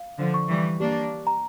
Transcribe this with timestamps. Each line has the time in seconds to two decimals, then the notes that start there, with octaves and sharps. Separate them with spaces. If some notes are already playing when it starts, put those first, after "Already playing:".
Already playing: F5
0.18 D3 F3
0.34 C#6
0.49 E3 G3
0.80 A#3 D4 G4
1.27 A#5